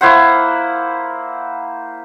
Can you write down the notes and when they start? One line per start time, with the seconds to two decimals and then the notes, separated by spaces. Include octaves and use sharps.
0.01 A#3 E4 C5 F#5